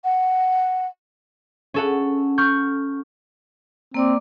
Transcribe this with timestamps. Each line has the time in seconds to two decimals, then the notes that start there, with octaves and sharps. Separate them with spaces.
0.04 F#5
1.74 C#4 A4 F#5
2.38 C#6 F6 G6
3.94 A#3 C4 D5 D6